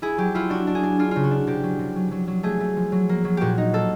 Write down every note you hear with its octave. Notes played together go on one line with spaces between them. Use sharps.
E4 G#4
F#3 G4
E4 F4
D4 F#4
D4
G#4
D4
D4 F4
C#3 F4
F#4
D4
C3 G4
F#3
C3
F#3
F#3
F#3
A3 G#4
A3
F3
F#3
A#3
F#3
A#2 F#4 G4
D#4
A#3 A4